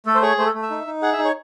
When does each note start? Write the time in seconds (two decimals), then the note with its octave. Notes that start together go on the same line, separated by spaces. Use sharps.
0.06 A3 A4
0.15 C5
0.22 G#4 C#5
0.38 A3 C5
0.46 A4
0.54 A3
0.62 E5
0.70 D#4
0.87 D#4
1.02 G#4 F#5
1.13 E5
1.19 D#4
1.25 C#5